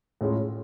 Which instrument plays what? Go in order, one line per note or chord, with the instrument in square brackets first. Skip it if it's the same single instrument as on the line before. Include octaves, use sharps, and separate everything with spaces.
[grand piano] A2 G#3 C#4 F4